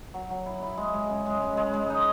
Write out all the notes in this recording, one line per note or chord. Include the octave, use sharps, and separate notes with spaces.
F#3
F#3
E4
E4
G#3
G#3
C#3
G#3
G#3
G#3
G#3
D#4